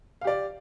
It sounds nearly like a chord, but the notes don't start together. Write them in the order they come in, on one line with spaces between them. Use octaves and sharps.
F5 G4 D5